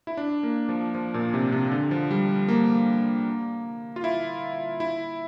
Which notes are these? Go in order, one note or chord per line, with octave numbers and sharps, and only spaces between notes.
E4
D4
A#3
F3
F3
A#2
C3
C3
D3
F3
G3
A#3
F4
E4
E4